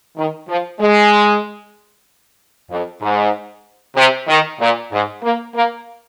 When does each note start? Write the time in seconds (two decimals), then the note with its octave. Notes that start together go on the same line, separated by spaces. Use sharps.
0.16 D#3
0.48 F3
0.80 G#3
2.69 F2
3.01 G#2
3.96 C3
4.28 D#3
4.59 A#2
4.91 G#2
5.22 A#3
5.54 A#3